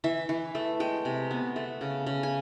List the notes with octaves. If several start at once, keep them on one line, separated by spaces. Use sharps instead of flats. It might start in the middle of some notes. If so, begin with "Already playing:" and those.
E3 E5
E3
A3
G#3 G5
C3
B3
A3
C#3
C#3
G#5